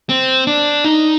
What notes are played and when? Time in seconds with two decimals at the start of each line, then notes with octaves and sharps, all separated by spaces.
0.09 C4
0.47 D4
0.84 D#4